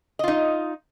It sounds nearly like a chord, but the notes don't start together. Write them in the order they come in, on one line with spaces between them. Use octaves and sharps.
D#5 F4 D#4